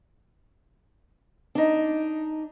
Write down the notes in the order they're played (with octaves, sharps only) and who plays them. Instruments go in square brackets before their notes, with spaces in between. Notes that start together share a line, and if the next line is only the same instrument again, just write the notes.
[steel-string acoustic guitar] D4 D#4